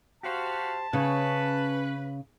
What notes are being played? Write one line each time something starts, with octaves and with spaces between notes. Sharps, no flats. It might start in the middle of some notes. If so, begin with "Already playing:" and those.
F#4 G4 C5 F5 A5
C#3 C#4 B4 C#5